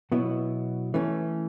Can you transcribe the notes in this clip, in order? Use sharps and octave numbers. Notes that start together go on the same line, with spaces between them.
B2 F#3 B3 E4
E3 A3 C#4